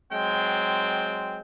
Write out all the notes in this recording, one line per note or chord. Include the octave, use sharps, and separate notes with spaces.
F#3 G#3 C4 G5